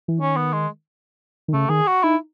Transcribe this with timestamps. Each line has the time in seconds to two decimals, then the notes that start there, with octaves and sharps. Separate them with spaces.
0.08 E3
0.20 D#3 C#4
0.37 B3
0.53 G#3
1.48 D#3
1.53 C#3 A3
1.69 D#3 G#4
1.87 F#4
2.03 D#4 E4